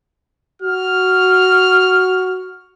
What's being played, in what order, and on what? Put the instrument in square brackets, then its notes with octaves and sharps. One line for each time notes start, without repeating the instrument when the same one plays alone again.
[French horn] F#4 [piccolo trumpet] F6